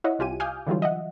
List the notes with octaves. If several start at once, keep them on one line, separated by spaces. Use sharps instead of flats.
E4 C#5 D#5 E5 F#5
C2 F4 G4 G#5 D#7
F5 G#5 D6 D#6 F6 G6
D3 E3 F#3 G3 F4
D#5 E5 F#5